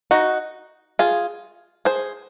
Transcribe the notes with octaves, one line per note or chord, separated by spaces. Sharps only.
D#4 F#4
F4 G#4
G#4 C5